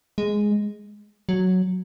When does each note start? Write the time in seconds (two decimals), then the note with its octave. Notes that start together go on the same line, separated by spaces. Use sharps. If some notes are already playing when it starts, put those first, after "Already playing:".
0.18 G#3
1.29 F#3